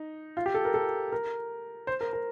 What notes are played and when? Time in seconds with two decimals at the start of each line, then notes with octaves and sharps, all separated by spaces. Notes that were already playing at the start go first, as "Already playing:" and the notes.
Already playing: D#4
0.37 F4
0.46 G4
0.54 A4
0.65 A#4
0.74 A4
1.12 A#4
1.87 C5
2.01 A#4
2.13 A#4